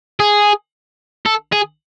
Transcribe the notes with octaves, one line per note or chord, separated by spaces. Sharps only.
G#4
A4
G#4